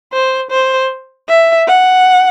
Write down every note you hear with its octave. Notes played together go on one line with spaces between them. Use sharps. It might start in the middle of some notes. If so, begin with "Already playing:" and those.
C5
C5
E5
F#5